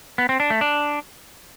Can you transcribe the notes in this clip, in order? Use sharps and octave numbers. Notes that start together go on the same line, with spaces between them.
B3
C4
D4
A3
D4